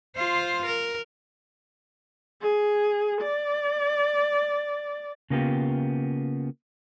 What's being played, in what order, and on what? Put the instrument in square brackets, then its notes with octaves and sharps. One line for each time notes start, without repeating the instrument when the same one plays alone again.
[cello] F4 C5
A#4
[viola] G#4
D5
[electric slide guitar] C#3 A#3 B3 F4 G4